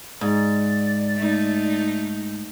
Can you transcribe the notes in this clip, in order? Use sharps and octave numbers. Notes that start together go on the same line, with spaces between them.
G#2 D5
A3 D#4